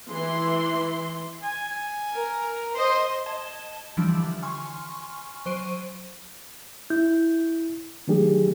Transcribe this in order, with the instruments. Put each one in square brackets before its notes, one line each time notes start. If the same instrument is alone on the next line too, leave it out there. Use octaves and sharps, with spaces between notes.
[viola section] E3 C6
[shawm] G#5
[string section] A#4
[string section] C5 D#5 [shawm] C6
[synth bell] D#5 A5 G#6 E7 G7
D3 E3 F3 G3 D4
G#5 C6 C#6 F6
F#3 C5 C#6 D7 D#7
[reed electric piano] E4 G6
D#3 F#3 A3 D4 G4 G#4